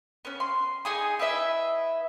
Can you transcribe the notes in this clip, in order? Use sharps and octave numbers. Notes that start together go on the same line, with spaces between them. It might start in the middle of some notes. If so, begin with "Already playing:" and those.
B3 C#4
C6
D#4 G#4 D#6
E4 B4 D#5 E5